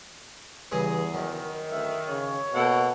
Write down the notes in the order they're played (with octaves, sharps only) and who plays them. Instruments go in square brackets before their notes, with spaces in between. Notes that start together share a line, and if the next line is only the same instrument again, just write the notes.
[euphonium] E2 [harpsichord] G2 C#3 E3 [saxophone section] G#4
[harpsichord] F#2 [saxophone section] D#3
[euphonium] D2 [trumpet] E5
[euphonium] C#3 [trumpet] C#5
[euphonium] B2 [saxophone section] A#3 A4 F#5